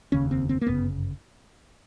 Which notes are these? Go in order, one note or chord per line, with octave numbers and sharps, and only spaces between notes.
F1 D#2 C#3 C#4
C4
C4
A#3
G1 F#2 C#3 B3